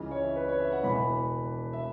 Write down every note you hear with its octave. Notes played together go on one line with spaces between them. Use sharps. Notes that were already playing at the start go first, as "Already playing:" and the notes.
Already playing: C#2 C#3 E3
C#5
E5
B4
C#5
E5
F#5
E1 E2 E3 B5
E5